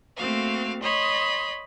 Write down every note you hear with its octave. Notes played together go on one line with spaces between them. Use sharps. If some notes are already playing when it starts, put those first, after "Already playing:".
A3 A#3 C4 F#4 F5
C#5 D#5 B5 C6